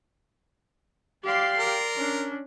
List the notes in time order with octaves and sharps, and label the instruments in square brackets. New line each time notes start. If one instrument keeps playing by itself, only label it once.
[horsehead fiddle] G4 F5 [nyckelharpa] D5 C6
[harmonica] A#4
[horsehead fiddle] C#4 D4